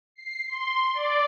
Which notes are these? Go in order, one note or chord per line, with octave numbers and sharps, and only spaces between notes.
C7
C6
D5